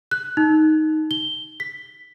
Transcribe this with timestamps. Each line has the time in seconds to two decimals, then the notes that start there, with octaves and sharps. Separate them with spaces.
0.11 F#6
0.37 D#4
1.11 G7
1.60 B6